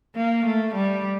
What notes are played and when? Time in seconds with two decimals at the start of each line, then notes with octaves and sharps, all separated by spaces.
0.16 A#3
0.45 A3
0.74 G3